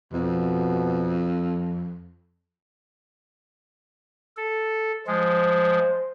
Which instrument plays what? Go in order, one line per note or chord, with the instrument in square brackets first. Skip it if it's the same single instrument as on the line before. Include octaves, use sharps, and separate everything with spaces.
[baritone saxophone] F2 [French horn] B2
[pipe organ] A4
[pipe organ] F3 G#3 [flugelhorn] C5